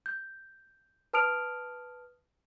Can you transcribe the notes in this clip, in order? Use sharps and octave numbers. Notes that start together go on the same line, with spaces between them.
G6
B4 A5 D#6 F6 D7 F7